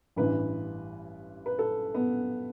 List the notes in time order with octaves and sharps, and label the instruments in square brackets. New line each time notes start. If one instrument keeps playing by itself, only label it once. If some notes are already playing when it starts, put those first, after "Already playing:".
[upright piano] A1 G2 E3 B4
B4
A4
B3